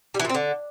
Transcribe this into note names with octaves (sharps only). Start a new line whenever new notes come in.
G3
E3
A#2
C4
D3